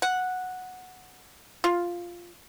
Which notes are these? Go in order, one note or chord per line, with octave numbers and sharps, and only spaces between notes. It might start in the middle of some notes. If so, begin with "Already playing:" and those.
F#5
F4